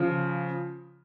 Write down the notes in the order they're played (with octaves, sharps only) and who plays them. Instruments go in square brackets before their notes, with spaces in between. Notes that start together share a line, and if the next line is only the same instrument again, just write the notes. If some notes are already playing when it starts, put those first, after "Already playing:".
Already playing: [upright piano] C#3 F3